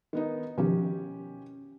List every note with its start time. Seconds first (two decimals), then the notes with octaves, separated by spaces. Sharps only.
0.13 D#3 B3 D#4
0.58 B2 D#3 F3 C#4 G4